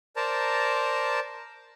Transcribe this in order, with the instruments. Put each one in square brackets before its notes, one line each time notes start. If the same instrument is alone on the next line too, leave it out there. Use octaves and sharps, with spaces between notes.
[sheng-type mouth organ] A#4 C5 D5 A5 A#5